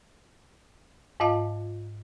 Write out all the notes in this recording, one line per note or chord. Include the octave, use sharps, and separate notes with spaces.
G#2 F4 D#5 F5 A5